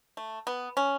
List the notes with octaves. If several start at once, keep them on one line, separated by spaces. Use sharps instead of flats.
A3
B3
C#4